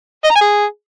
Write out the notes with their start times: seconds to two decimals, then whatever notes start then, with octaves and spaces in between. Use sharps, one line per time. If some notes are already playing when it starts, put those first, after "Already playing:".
0.24 D#5
0.30 A#5
0.36 G#5
0.41 G#4